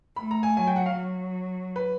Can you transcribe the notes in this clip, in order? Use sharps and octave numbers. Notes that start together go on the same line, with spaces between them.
A3 B5
A#5
G#5
F#3 G#5
G5
F#5
F5
F#3
B4